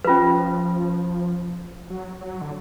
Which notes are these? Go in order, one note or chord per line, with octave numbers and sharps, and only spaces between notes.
F3 C#4 F4 B4
F#3
F#3
D3